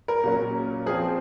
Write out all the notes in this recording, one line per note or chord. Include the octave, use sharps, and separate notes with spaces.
A#4
A#2 F#3 C#4
F3 C4 G#4